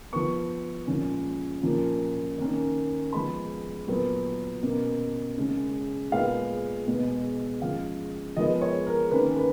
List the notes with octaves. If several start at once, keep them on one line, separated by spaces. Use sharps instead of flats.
F3 B3 C#6
A#2 F3 G#3 C#4
A#2 F3 A#3 C#4
D#3 A#3 C#4
F3 G#3 B3 B5
A#2 F#3 B3
B2 A#3 C#4
C#3 G#3 C#4
A#2 G#3 B3 F5
B2 G#3 B3
F3 G#3 C#4 F5
F3 G#3 B3 D#5
C#5
A#4
D#3 A#3 C#4 B4
B4